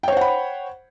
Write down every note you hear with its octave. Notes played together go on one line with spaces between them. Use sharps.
C5 C#5 F#5 G5 B5